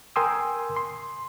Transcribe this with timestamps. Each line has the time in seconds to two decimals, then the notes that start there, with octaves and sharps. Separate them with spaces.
0.16 A#4 G5 G#5 C6 D#6 E6
0.76 C6